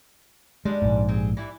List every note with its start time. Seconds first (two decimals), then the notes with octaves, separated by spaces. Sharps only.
0.65 G3 G#3 D4
0.82 A#1 G#2
1.09 C4 G#4
1.37 E3 G3 E4